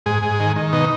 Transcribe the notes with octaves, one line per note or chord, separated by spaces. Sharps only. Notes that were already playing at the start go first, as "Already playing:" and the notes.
G#2 G#4
G#2
D#3
D#3
B2 D#4